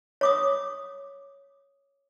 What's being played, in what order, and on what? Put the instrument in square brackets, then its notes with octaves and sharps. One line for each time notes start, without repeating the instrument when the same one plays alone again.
[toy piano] C#5 D6 D#6